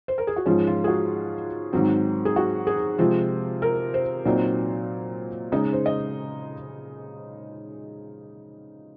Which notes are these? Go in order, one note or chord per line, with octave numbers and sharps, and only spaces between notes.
C5
A#4
G#4
F#4
G#2 F3 G#3 C#4 F4
F4
G#4
F#4
G#2 D#3 F#3 C4
G#4
F#4
G#4
C3 F3 G#3 C4 F4
A#4
C5
A#2 F#3 C4 D#4
C#3 G#3 D#4 D#5
C5
D#5